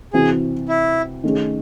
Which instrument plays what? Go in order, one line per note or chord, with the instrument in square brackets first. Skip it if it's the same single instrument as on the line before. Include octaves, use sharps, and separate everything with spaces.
[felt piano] C3 E3 C4 F#4 [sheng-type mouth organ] G#4
[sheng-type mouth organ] E4
[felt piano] D#3 A3 C#4 G#4